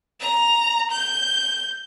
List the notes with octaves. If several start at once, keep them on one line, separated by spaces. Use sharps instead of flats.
A#5
G6